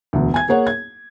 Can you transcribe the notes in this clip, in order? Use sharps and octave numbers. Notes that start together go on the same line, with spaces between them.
E1 D2
G#5 G#6
A#3 G#4 C#5 F#5
G#6